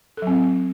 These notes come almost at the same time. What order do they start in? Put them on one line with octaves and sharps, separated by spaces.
A4 F#3 C4